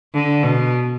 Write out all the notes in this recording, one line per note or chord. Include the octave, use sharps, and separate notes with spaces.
D3
B2